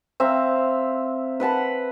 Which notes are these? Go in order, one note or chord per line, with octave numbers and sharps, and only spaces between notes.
C4 E5 F5 A#5
B4 F#5 A5 B5